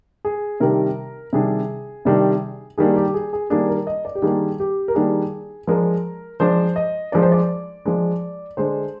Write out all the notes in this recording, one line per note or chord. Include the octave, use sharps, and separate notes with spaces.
G#4
C3 D#3 G3 D4 A#4
C3 D#3 G3 D4 G#4
C3 D#3 G3 D4
D#3 G3 A#3 D4 G#4
G4
G#4
G#4
D#3 G3 A#3 D4 G#4
A#4
D#5
D5
G4
D#3 G3 A#3 D4 G#4
G4
A#4
D#3 G3 A#3 D4 G#4
F3 G#3 D4 A#4
F3 G#3 D4 C5
D#5
F3 G#3 D4 D5
C5
D5
F3 G#3 D4
D3 G#3 D4 C5